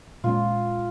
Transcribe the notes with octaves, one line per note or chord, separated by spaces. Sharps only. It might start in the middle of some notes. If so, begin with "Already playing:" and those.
A#2 G#3 C#4 F4